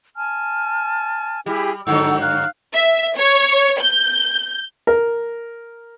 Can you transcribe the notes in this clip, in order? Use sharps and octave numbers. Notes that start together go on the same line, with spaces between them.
G#5 A5 F6
G3 E4 G4 G#4
G2 D3 F#3 A4 F#5 E6
F5 F6 F#6
E5
C#5
G6
A#4